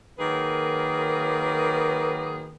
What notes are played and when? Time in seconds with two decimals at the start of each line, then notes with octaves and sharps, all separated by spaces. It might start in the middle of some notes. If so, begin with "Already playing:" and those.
0.18 D#3 F#3 A#3 G#4 B4